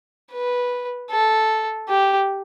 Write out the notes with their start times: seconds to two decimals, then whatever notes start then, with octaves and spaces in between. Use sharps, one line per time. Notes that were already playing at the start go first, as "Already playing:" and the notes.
0.32 B4
1.11 A4
1.89 G4